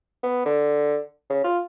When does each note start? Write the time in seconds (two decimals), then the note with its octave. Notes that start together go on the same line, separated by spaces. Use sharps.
0.23 B3
0.46 D3
1.30 C#3
1.44 F4